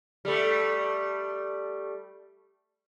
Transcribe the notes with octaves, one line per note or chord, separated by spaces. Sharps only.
G3 A3